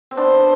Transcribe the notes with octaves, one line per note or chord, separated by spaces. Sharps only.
C4
B3 D4 C5